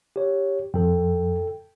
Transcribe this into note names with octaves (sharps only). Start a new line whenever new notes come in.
G4 C#5
F2 A4 G5